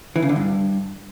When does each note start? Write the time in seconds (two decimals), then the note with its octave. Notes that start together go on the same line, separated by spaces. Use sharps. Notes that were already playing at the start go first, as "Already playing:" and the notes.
0.16 E3
0.22 C#3
0.29 D3
0.36 G2